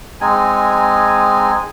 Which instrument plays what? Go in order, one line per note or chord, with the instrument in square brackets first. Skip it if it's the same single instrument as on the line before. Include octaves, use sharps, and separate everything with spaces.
[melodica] G#3 C4 D#4 G#5